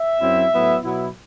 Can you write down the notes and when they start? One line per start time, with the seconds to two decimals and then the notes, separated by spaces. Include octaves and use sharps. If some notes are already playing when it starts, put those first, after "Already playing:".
Already playing: E5
0.21 F#2 F#3 C4 E4
0.52 A2 F#3 B3 E4
0.83 B2 F#3 B3 E4